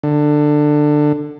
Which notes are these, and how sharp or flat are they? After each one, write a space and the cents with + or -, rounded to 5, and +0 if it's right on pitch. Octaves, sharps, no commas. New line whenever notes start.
D3 +15